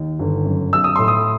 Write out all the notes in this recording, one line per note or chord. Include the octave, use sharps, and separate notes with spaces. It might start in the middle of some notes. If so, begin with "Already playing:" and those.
Already playing: D#2 D#3
G1
F#2
B1 E6
D#6
A2 C6
D#6